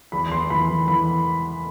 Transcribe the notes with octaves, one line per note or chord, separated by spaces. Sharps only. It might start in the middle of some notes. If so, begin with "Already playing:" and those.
E2 B5
E2 C6
E3 B5
E3
E3 B5